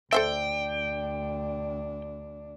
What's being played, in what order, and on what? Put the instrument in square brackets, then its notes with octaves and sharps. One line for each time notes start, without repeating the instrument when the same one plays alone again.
[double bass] D2 D4 [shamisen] A4 C5 E5 [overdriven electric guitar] G5